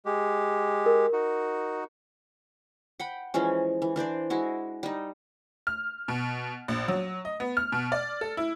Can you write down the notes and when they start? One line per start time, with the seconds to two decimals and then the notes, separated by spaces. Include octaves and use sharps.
0.06 G#3 G4
0.86 A#4
1.13 D#4 F#4
3.00 F#5 G5 B5
3.34 E3 F3 G#3 C#4
3.82 E3
3.96 E3 D4 C5 D5
4.30 G#3 E4 F#4
4.83 G3 D#4
5.67 F6
6.08 B2
6.68 A#1
6.88 F#3
7.25 D#5
7.40 B3
7.57 F6
7.72 B2
7.92 D5
8.21 A4
8.37 E4